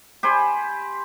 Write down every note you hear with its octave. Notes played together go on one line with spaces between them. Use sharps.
G4 C5 G#5 B5